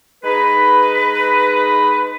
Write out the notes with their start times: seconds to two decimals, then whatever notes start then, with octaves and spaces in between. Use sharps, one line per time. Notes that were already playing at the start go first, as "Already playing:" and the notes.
0.24 G#3 D#4 B4